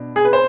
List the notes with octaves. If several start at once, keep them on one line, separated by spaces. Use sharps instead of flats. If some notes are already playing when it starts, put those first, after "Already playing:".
Already playing: B2 D4
G#4
B4
C5